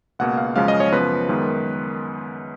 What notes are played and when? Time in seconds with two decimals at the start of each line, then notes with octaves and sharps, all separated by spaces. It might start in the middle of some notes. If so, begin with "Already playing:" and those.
0.19 C#2 B2 A#3 F#5
0.37 F5
0.56 F#2 C#3 F3 G#3 C#4 F5
0.68 D#5
0.80 C#5
0.92 F#2 C#3 F3 B3 B4
1.29 F#2 D#3 G#3 B3